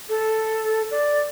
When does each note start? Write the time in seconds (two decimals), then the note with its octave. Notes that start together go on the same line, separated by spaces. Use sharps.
0.09 A4
0.91 D5